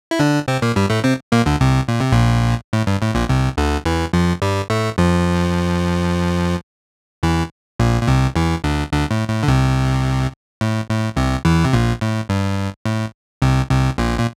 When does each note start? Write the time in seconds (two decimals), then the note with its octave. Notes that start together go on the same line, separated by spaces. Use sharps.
0.11 E4
0.20 D3 D4
0.48 C3 C4
0.62 A#2 A#3
0.76 G2 G3
0.90 A2 A3
1.04 C3 C4
1.32 A#2 A#3
1.46 D2 D3
1.61 C2 C3
1.88 A#2
2.00 C3
2.12 A#1 A#2
2.73 A2
2.87 G2
3.02 A2
3.15 A#1 A#2
3.29 C2 C3
3.57 D2 D3
3.85 E2 E3
4.13 F2 F3
4.42 G2 G3
4.70 A2 A3
4.98 F2 F3
7.23 E2 E3
7.79 A#1 A#2
8.02 A#2
8.07 C2 C3
8.36 E2 E3
8.64 D2 D3
8.92 D2 D3
9.11 A2
9.30 A2
9.43 D3
9.48 C2 C3
10.61 A2
10.89 A2
11.16 C2 C3
11.45 E2 E3
11.64 C3
11.73 A#1 A#2
12.01 A2
12.29 G2
12.85 A2
13.42 C2 C3
13.70 C2 C3
13.98 A#1 A#2
14.19 A#2